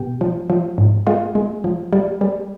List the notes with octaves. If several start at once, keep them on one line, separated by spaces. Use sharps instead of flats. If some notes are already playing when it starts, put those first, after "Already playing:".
Already playing: B2 G4
F3
F3
G#2
G#3 F4
G#3
F3
G3
G3